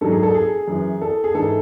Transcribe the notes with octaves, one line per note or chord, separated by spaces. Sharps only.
G#2 F#3 A4
G#4
A4
G#4
F#2 E3
A4
G#4
G#2 E3 A4